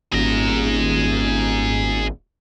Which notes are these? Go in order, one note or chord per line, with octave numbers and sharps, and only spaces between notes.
D#1 G#1 G#4 A#5